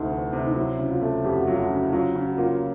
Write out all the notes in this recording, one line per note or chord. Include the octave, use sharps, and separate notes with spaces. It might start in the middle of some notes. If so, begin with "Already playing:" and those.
Already playing: D2 C3 E3 A3 D#4
E3
C3
D#4
F#3 E4
C#3
F4
A3
F2 G4
F#4
F#3 F4
F#4
C#3
E4
F#3 F4
C#3
F#4
A#3 F4